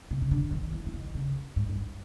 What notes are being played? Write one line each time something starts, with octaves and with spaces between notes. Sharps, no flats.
C3
C#3
D3
D#3
E3
E3
D#3
C#3
G#2
G2